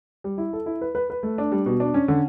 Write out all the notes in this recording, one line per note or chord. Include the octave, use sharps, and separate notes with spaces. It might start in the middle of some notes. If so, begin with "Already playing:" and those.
G3
E4
A4
E4
B4
B4
B4
A3
D4
G3
B2
D4
C#4
D3